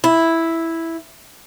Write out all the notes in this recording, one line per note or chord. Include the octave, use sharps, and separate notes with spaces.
E4